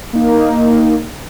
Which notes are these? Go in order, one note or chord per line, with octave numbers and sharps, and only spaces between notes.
A#3 D#4